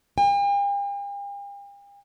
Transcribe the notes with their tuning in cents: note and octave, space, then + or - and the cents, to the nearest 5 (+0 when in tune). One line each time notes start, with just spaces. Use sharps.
G5 +45